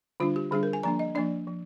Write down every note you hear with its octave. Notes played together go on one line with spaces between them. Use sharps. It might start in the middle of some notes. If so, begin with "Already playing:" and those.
D3 G3 D4 F4
G4
D3 G3 D4 G#4
A#4
G#5
F3 A#3 D4 A#5
D#5
F3 A#3 D4 D5
F3